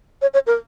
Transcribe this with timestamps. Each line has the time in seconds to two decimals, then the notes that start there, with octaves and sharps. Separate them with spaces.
0.22 C#5
0.34 C#5
0.47 A#4